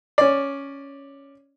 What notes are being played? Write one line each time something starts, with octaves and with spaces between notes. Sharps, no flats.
C#4 D5